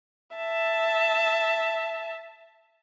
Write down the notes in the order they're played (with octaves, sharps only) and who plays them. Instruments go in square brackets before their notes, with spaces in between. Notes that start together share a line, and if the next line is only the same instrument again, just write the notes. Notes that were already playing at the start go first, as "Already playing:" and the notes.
[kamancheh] E5 A5